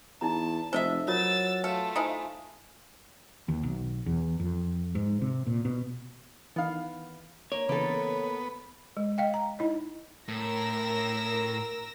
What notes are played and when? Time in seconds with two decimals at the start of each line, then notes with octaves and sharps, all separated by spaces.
0.21 E2 D#4 E4 A5 A#5
0.73 F1 A4 C5 D#5 E5
1.08 F#3 F4 A#4 C#5 E6 A6
1.64 A3 F4 A4 B4
1.96 D#4 E4 C5 G#5 D#6
3.49 D#2
3.63 B1
4.06 E2
4.40 F2
4.95 G#2
5.22 C3
5.47 A#2
5.65 B2
6.56 D#3 E3 B3 F5
7.52 A#3 C#5
7.69 C#3 E3 A#3 B3 A4
8.97 G#3
9.18 D#5 F5 G5
9.34 A#5
9.59 D#4 E4 D#5
10.28 A2 A#4 E6 A#6